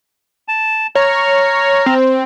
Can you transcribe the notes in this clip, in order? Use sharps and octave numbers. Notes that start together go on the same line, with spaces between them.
A5
C#5 A#5 F6
C4